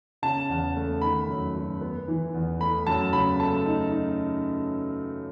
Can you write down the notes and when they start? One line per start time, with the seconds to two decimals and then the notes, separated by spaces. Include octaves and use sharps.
0.22 C#3 A5
0.49 E2
0.76 A3
1.02 D#3 B5
1.28 F#2
1.55 F#2
1.81 B3
2.08 E3
2.34 E2
2.60 A3 B5
2.87 F#2 A5
3.13 C#3 B5
3.40 A3 A5
3.66 D#4
3.92 D#4